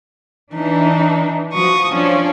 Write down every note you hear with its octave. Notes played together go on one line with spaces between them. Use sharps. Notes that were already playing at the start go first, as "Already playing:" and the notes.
E3 D4 D#4
F3 F#4 C#6 D#6
F3 C#4 D4 C#5